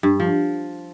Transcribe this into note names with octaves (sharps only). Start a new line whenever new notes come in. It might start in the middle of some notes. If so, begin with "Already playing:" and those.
G2
F3